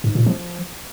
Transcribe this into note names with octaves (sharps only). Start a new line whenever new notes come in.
G#2
A#2
F3